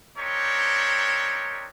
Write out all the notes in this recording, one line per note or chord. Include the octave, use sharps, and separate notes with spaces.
C4 D4 D#4 G4 A#4 C#5